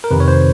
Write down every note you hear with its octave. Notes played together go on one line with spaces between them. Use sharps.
A#4
F2 C3 D#3 B4
C#5
C5